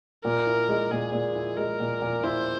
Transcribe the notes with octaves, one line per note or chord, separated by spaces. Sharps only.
A#2 A#4
E4
G#3
A#2 G#4
A#2
E4
G#3 A#4
A#2
A#2
E4 C5